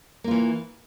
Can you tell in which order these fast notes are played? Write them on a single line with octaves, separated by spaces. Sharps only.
A#3 F4 E3